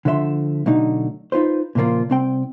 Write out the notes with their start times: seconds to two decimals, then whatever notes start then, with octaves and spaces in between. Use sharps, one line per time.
0.05 D3 F3 A3 C4 E5 C6
0.66 B1 D3 A3 D#4
1.32 D#4 F4 B4 C5
1.75 A#2 C#3 F3 A#3 F4
2.10 C2 C4 G5